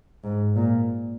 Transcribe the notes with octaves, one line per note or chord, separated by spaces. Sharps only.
G#2
A#2